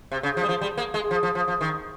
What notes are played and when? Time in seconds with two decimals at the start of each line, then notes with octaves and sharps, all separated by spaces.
0.12 C3
0.23 C#3
0.37 F3
0.43 G3
0.49 F3
0.61 G3
0.78 A#3
0.94 G#3
1.11 F3
1.23 F3
1.35 F3
1.48 F3
1.61 D#3